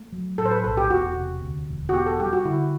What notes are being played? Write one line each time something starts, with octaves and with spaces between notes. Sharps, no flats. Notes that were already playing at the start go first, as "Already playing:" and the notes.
Already playing: A3
F#3
A2 A4
C5
B4
B1 A4
G4
E1 F#4
C3
D2
E1
F#4
B3 G4
A4
G3 G4
F#4
D3 E4